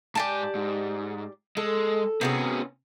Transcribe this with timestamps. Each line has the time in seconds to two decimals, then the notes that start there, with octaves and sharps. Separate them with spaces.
0.15 G#2 G4 D5 G#5 A5
0.55 G#2
1.57 G#3 A4
2.21 C3 B3 C#4 F#4 G#4